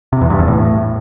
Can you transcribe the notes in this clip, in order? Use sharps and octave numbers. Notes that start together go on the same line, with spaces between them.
C3
E2
G2
E2
A2